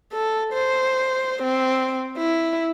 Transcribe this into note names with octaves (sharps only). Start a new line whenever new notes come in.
A4
C5
C4
E4